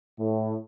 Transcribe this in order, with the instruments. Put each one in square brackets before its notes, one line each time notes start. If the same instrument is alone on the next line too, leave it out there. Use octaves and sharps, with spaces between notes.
[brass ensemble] A2